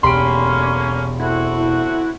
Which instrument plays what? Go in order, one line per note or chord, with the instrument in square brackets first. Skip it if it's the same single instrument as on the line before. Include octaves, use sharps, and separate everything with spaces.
[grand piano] E1 G4 D7 [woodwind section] D3 A#3 C#4 [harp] B5 C6
[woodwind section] A3 C4 F#4 [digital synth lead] E4